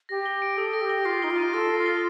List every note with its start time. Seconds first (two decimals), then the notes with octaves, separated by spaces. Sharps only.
0.09 G4 A#6
0.26 G7
0.42 D7
0.57 A4 D#6
0.73 A#6
0.81 G4
0.89 G7
1.05 F4 C7
1.22 D#4 G7
1.30 F4
1.38 D#7
1.53 A4 A6
1.70 C7
1.78 F4
1.86 G7